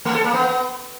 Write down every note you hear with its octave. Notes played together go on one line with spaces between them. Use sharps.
A3
A4
A#3
B3